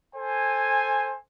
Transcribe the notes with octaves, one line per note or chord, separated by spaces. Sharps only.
A4 C5 G#5